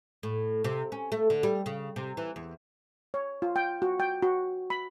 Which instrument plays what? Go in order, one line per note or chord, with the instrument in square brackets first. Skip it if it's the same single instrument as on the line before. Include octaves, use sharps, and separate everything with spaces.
[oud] A2
C3
C#4
A3
D3
G3
C#3
C3
E3
E2
[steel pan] C#5
F4
G5
F#4
G5
F#4
B5